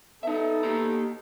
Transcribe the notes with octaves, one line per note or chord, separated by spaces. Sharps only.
B3 D#4 A4 E5
A#3 G4 A#5